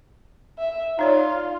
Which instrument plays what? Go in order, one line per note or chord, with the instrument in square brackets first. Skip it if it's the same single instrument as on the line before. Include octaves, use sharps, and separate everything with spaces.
[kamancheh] E5
[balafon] D#4 C#5 D5 [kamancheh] F4